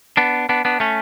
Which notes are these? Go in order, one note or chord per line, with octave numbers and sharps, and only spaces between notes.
B3 D4
B3 D4
B3 D4
A3 C#4